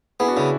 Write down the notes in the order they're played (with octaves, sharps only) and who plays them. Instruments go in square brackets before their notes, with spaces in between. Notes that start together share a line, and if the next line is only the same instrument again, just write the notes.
[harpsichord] B3 [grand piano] E4 G#4
[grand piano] D4 F#4
[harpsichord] C#3 [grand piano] C#4 E4